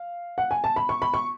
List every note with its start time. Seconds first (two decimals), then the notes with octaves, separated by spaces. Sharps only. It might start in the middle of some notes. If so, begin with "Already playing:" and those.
Already playing: F5
0.38 F#5
0.51 G#5
0.64 A5
0.76 B5
0.89 C#6
1.02 B5
1.14 C#6